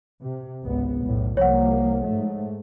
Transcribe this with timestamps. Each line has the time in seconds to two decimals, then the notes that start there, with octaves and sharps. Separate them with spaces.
0.22 C3
0.63 G#1 C#2 B3
1.02 B1 E2 A2
1.37 C2 F3 A#3 C#5 F#5
2.03 G#2 A3